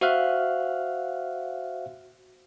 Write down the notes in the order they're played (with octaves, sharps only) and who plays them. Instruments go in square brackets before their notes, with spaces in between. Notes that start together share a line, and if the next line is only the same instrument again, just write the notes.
[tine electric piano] F#4 C5 E5 F5 F6 F#6